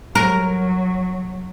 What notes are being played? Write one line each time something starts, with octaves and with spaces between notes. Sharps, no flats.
F#3 A#4